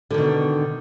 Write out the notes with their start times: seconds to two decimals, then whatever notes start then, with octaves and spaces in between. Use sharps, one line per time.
0.11 D3
0.14 D#3
0.18 B2